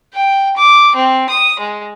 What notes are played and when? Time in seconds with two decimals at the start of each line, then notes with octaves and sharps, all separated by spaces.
0.14 G5
0.56 D6
0.95 C4
1.29 D#6
1.59 G#3